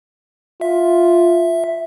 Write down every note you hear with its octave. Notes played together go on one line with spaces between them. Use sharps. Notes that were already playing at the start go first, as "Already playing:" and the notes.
F4 E5